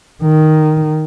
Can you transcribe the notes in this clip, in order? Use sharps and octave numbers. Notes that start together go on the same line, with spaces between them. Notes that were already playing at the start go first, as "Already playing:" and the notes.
D#3